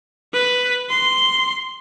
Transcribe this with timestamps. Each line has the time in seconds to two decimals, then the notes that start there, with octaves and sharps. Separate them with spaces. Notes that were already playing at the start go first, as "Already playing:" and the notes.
0.33 B4
0.89 C6